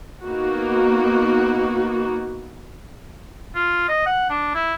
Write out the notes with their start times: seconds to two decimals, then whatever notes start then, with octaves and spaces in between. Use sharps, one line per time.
0.23 A#3 B3 D#4 F#4
3.55 F4
3.89 D#5
4.06 F#5
4.30 D4
4.54 E4